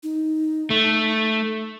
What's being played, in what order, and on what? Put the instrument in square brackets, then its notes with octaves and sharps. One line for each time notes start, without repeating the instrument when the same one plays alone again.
[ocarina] D#4
[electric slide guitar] A3